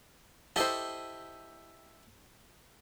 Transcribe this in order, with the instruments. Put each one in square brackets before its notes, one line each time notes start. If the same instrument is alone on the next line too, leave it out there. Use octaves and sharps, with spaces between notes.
[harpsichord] E4 G4 D#5 [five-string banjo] A4 C5